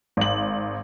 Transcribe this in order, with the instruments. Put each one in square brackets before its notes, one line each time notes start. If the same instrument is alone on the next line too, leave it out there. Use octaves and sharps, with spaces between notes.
[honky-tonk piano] G#1 F#7